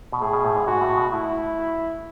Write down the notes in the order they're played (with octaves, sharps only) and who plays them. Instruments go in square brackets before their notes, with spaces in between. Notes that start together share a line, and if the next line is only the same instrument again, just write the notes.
[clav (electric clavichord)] B2
[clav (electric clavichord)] A2 [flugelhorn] G#4
[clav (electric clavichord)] B2
A2
G#2
[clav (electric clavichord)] G#2 [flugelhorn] F#4
[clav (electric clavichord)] A2
B2
[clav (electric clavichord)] A3 [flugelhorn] E4